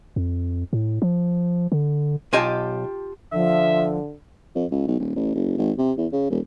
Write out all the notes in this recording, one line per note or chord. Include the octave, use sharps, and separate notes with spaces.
F2
A2
F3
D3
B1 F4 G4 D#5 G#5 A5
D3 F3 E5
F2
C#2
B1
D#1
A1
F#1
G#1
C3
E2
C#3
E1